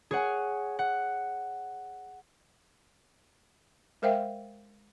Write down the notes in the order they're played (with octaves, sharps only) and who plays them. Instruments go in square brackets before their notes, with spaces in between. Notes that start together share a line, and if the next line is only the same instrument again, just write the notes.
[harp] G#4 C#5 F#5 G#5
F#5
[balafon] G#3 A#4 C5 E5 F5 G5